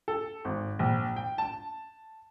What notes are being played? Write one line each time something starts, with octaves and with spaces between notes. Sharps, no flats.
A4
G#1
A#1
G5
A5